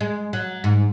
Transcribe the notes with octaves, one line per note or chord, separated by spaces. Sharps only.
G#3
F#3
G#2